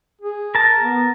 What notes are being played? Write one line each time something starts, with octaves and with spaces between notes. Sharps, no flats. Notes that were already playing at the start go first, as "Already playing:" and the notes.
G#4
A#4 A5
B3